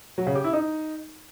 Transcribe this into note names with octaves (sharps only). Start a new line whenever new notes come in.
F#3
C#3
G4
E4
D#4